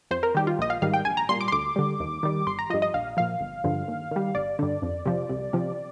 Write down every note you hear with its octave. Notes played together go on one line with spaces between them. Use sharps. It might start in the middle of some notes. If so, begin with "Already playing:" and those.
F2 C5
A#4
D#3 G3 G4
F4
A#1 D#5
F5
G#2 D#3 G3 F5
G5
A#1 G#5
A#5
A#2 G3 C6
D6
C6
D2 D6
D3 G3
D#2
D#3 G3
G1 C6
A#5
G2 F3 D#5
D#5
A#1 F5
A#2 F3 F5
G1
G2 D3 F3
D#2
D#3 G3
G1 D5
G2 D3
F2
C3 F3
C2
C3 F3